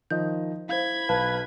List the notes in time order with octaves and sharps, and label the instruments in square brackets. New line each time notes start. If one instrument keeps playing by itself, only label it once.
[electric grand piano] D#3 F3 D#5 [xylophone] G6
[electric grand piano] E4 [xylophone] C5 F5 [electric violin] B5 G#6
[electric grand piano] B1 F5 [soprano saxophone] B4 [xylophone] A5